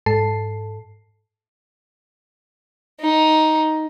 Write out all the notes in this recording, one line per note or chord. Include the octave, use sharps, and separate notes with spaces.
G#2 A4 A5 C7
D#4